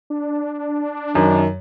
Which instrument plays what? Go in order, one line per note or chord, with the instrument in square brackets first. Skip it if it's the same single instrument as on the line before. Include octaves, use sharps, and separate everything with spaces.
[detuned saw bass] D4
[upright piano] F#2 [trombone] D#3